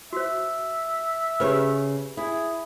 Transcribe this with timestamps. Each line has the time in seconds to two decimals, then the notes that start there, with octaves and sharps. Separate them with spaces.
0.13 F#4 C5 E5
1.40 C#3 G4 B4 C#5
2.17 E4 G#4